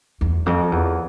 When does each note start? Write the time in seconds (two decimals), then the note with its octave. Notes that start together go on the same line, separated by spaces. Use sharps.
0.21 E2
0.46 F2
0.72 E2